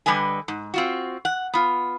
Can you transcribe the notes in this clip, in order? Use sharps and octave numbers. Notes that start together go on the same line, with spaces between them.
D3 G3 B4 D#5 G#5
G#2
C4 F4 F#4
F#5
B3 F4